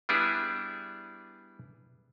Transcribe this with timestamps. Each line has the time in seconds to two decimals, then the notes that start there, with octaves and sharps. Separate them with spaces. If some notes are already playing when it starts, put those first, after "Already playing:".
0.09 G3 B3 D4 E4 G#4